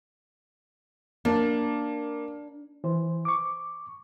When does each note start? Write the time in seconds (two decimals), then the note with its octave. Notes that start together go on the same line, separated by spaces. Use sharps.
1.25 A#3 D4
2.84 E3 C5
3.25 C#6 D6